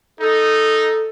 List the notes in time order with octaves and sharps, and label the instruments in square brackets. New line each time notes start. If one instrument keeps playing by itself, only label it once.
[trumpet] D#4 [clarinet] A4